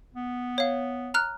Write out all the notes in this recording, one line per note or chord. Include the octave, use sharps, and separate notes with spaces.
B3
C#5 F5
A#5 F6 F#6